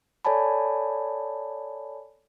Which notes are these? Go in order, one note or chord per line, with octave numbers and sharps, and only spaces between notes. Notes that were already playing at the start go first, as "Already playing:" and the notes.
A4 C#5 D5 G#5 A5 B5